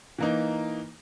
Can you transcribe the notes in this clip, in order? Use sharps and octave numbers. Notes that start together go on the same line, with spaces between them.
E3 A#3 D#4